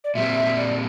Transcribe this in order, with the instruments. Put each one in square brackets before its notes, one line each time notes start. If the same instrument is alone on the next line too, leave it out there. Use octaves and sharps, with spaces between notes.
[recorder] D5
[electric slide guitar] A#2 G3 C4 [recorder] E5
[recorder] E5
D5